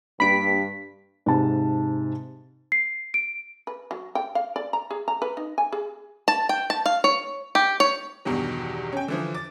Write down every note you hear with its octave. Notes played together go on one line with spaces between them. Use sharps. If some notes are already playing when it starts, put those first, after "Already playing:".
G2 A#3 D4 G4 B5 B6 D7
G#2 C3 A5
C7
D7
B4
F#3
G5
F5
D5
A#5
G#4
A#5
B4
D#4
G#5
G#4
A5
G5
A5
F5
C#5
G4
C#5
E2 G2 B2 D#3 F#3
C#4 G5
D3 E3 F3
D6 A6